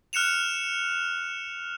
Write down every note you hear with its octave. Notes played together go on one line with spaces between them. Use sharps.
F6 F#6 C#7 E7 F7